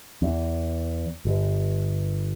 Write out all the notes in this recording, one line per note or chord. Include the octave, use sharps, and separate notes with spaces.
E2
G1